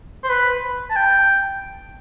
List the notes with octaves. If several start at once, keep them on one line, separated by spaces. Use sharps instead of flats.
C5
B4
A5
G5